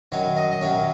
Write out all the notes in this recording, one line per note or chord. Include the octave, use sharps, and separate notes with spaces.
F#2 D#3 F#3 C#5
D#5
D#5
F#2 D#3 F#3 C#5